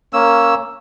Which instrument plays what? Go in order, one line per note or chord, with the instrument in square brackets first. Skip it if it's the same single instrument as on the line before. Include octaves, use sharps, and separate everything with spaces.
[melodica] A#3 C#4 E6